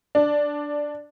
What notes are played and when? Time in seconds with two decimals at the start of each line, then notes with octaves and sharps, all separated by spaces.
0.15 D4